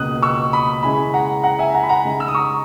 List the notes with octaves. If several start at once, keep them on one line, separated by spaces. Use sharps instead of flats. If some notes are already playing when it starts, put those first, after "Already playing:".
Already playing: C#2 B2 A#3 C#4 D#6 F#6
C#6 E6
B5 D#6
C#3 G#3 C#4 E4 G#5 B5
F#5 A#5
F#5 A#5
E5 G#5
F#5 A#5
B5
F#5 A#5
C#3 G#3 D#4
E6
D#6
A#5 C#6